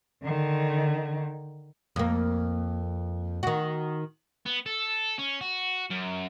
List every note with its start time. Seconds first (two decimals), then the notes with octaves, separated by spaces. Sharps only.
0.23 D3 D#3
1.96 F2 A#3
3.43 D#3 F#4
4.46 B3
4.66 A4
5.19 C#4
5.41 F#4
5.91 F#2